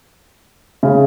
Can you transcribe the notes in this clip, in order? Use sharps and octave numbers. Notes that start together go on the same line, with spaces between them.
C#3